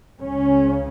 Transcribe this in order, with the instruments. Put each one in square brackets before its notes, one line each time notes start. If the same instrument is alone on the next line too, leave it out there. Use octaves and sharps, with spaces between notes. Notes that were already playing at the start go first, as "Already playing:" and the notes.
[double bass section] C#2 C#3 C#4